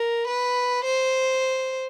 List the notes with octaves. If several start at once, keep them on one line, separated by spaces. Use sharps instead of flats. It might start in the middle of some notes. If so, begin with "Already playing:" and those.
Already playing: A#4
B4
C5